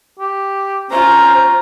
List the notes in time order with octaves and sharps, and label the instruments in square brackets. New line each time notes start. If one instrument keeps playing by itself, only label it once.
[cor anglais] G4
[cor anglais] C#4 [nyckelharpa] F4 A#5 [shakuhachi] C5